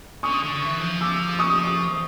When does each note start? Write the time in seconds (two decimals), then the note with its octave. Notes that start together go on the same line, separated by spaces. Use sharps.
0.23 D3 C#6 D#6
0.43 D3
0.62 E3
0.81 F3
1.01 D6 E6
1.39 C#6 D#6